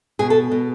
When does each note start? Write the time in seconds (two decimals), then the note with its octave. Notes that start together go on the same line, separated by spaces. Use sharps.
0.19 B2 G#4
0.30 A4
0.51 B2